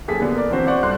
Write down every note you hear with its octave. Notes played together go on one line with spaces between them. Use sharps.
F#1 D#2 G#4 A4 B6
A#2 D3 B3
A#4 D5
E3 C4 D4 F#4 C5
C5 D5 F#5 C#6
G2 A4 C6 F#6